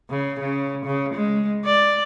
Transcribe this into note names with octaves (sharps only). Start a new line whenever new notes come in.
C#3
C#3
C#3
G#3
D5